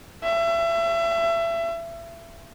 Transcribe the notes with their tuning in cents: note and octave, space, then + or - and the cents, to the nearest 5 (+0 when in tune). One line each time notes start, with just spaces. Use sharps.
E5 +30